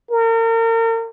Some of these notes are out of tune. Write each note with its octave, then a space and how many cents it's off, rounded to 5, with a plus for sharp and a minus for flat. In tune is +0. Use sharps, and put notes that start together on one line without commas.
A#4 -35